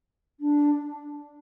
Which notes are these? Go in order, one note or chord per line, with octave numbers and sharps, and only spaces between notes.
D4